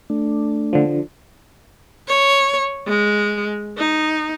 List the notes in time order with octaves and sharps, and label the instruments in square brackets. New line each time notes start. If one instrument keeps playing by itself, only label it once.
[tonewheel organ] A3 D4
[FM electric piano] D3 F3
[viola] C#5
G#3
D#4